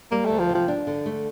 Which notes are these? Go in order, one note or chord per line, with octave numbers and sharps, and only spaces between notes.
G3 A#3
D2 A3
F3
C3
F3
D4
D3
A3